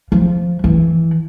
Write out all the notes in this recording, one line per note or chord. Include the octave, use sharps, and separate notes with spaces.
F3
E3